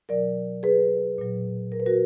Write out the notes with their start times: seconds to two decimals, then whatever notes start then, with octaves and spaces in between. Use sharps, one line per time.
0.09 B2 F#3 A#4 D5
0.63 G#4 B4
1.18 A#2 F#3
1.72 A#4
1.80 B4
1.86 F#4 A#4